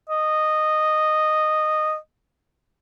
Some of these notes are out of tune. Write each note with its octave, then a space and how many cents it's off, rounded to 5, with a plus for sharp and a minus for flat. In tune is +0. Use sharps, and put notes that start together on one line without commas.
D#5 -10